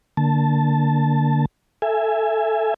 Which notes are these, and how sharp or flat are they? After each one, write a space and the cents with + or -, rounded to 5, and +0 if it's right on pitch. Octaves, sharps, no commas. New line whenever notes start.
D3 +0 A#3 +0 A5 +0
A4 +0 E5 +15 G#5 +0